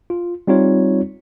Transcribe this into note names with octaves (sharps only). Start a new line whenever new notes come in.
F4
G3 C4 D#4 F4 C#5